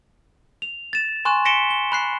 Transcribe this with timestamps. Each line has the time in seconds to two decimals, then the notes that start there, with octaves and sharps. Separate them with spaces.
0.62 F7
0.93 A6 E7
1.25 G#5 C6 C#6 F#6 E7
1.45 A#6 B6 C#7 D7 E7 G7
1.70 G7
1.92 B5 F#6 C7